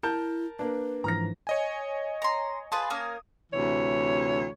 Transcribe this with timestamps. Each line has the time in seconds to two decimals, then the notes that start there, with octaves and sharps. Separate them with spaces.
0.03 E4 A#4 A5 G6
0.59 A#3 D4 B4
1.04 G#2 E3 F3 A#5 F6 A#6
1.47 C#5 D#5 G#5
2.22 A#5 C6
2.72 F4 G#4 B4 A5
2.90 A#3 C#4 A#4 D#6
3.53 D2 C3 E3 C#5